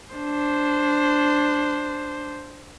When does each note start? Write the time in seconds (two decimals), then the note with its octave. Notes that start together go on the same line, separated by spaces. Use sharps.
0.14 D4 C5